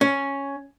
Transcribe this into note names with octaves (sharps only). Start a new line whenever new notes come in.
C#4